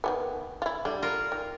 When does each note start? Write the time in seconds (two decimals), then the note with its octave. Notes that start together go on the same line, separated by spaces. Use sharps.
0.04 D#3 G#3 B3
0.62 E4 F4
0.85 D3 G3
1.02 F4 A#4
1.32 D#3